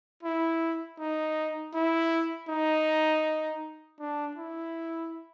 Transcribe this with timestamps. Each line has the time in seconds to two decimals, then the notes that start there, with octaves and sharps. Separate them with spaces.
0.23 E4
0.99 D#4
1.74 E4
2.49 D#4
4.00 D4
4.37 E4